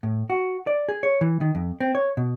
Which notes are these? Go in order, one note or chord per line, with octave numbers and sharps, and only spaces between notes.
A2
F#4
D5
G#4
C#5
E3
D#3
F2
C4
C#5
B2